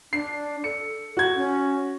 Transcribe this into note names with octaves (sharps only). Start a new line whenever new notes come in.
D4 C7
A4 C#7
F#4 G#6
C#4